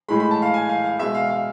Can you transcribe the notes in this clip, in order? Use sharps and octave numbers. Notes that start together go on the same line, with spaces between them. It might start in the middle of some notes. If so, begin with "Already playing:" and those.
A2 G#3 B5
B5
A5
F5
G#5
F5
F5
B2 G#3 E5
F5
F5